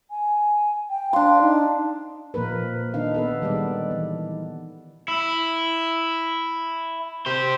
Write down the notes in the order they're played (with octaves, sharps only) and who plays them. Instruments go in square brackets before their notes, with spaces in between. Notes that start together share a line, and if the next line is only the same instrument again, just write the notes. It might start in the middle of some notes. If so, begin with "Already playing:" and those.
[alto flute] G#5
G5
[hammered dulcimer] D4 C6 [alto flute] F5
[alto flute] D#4
[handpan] A#2 F3 A#3 A#4 B4
D#3 D4 D#4 F5
B3 A4 B4
D#3 G3 G#3 B3 D5
E3
[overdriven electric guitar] E4
G4 C5